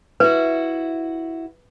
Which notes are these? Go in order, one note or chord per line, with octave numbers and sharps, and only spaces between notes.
E4 F#4 B4